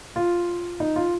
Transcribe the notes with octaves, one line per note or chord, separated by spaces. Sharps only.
F4
D#4
F4